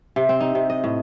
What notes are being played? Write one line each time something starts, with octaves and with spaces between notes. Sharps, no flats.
C3
C4
D#4
C3
D#5
A2